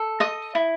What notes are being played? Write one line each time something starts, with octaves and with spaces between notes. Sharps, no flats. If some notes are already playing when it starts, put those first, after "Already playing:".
Already playing: A4
D#5 D#6
E4